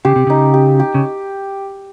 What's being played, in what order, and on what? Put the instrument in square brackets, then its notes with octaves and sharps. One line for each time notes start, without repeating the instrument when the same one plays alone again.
[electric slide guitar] C#3 [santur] G4
[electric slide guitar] C3
[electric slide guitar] C#3 [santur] D#4
[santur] G4
G4
[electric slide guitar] C#3